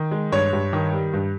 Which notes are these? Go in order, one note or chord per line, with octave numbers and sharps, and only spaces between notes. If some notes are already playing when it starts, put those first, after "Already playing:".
Already playing: D#3
G#3
G2 C#5
G2
D#3
G3
G2